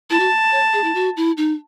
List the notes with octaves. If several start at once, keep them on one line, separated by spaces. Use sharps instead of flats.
E4 A5
F#4
C#5
G#4
E4
F#4
E4
D#4